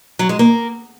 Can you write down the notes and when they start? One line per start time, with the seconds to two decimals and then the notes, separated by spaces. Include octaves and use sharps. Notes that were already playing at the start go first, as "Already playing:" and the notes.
0.19 F#3
0.29 G#3
0.39 A#3